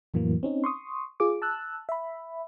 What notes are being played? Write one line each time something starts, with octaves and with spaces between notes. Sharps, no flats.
F2 A2 E3 F#3 A#3
C4 C#4 D#4
C6 C#6 D#6
F4 G#4 D6
A5 E6 F#6
E5 B5